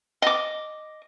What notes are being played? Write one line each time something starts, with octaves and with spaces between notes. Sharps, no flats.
D#5 D6